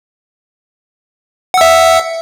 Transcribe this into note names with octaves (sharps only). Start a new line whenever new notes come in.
E5 F#5 E6